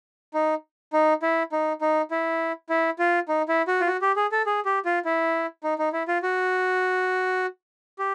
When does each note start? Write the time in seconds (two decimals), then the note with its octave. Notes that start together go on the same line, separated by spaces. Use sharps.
0.34 D#4
0.93 D#4
1.22 E4
1.52 D#4
1.81 D#4
2.11 E4
2.69 E4
2.99 F4
3.28 D#4
3.49 E4
3.68 F#4
3.81 F4
3.87 F#4
4.02 G4
4.16 G#4
4.32 A4
4.46 G#4
4.65 G4
4.85 F4
5.05 E4
5.64 D#4
5.79 D#4
5.93 E4
6.08 F4
6.23 F#4
7.99 G4